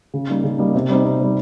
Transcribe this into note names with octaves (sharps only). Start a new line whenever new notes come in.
C#3
G3 A#3 D#4
C#3
G3 A#3 D#4
C3
G3 C4 D#4
C3
G3 C4 D#4